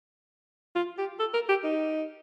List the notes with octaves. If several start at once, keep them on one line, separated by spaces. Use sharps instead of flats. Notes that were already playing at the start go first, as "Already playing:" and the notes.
F4
G4
A4
A#4
G4
D#4